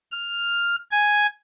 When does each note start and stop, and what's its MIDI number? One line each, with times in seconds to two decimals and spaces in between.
0.12 0.76 89
0.91 1.26 80